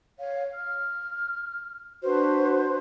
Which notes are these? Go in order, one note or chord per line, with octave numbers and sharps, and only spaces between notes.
C#5 F5
F6
D4 F#4 B4 C5